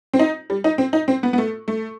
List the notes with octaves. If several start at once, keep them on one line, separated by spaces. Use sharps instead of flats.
C4
D#4
G3
D#4
C4
D#4
C4
B3
B3
A3
A3